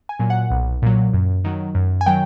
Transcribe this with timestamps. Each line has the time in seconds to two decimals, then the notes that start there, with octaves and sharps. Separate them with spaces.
0.09 G#5
0.20 A#2 F#3
0.30 F#5
0.50 B1
0.82 A#2 F#3
1.13 F#2
1.44 D#3 F#3
1.75 F#2
2.01 G#5
2.06 D#3 F#3 G5